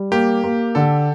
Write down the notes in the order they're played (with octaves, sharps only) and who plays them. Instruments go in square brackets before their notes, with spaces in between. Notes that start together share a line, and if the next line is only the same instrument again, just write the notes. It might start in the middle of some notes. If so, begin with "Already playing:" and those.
Already playing: [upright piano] G3
[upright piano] A#3 [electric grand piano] G4
[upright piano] A#3
[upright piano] D3 [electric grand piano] A4